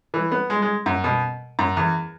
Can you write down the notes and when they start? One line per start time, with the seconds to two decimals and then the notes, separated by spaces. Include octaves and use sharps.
0.14 E3
0.32 B3
0.50 G#3
0.62 G#3
0.86 F#2
1.04 B2
1.59 F#2
1.77 E2